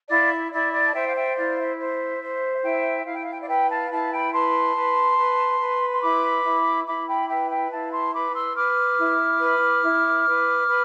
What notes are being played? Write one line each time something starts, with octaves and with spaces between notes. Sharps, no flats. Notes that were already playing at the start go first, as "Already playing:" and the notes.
E4 D5 F5
E4 D5
D5
A5
C5 E5 G5
F5
E5 G5
E4 D5 F5
E5
C5
C5
E4 E5 G5
E4 F5
G5
F5
G5
D5 F5
B4 E5 G5
F5 A5
E4 F5 A5
G5 B5
B4 A5 C6
B4
B4
B4
C6
E4 B5 D6
E4
E4 B5 D6
G5 B5
B4 E5 G5
E5 G5
E4 F5 A5
A5 C6
B4 B5 D6
C6 E6
B4 D6 F6
E4
B4
E4
B4
B4